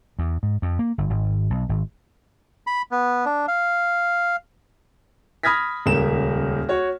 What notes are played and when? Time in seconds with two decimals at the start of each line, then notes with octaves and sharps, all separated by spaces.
0.19 E2
0.43 G#2
0.62 F2
0.79 A#3
0.98 G1
1.10 G#1
1.50 B1
1.69 G#1
2.67 B5
2.91 B3
3.26 D4
3.48 F5
5.43 B5 D#6 F6 G#6 A#6 B6
5.86 D#1 C#2 A#4 E7
6.69 F#4 C#5